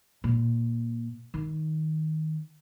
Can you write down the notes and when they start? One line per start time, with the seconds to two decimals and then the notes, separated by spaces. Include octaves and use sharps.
0.24 A#2
1.34 D#3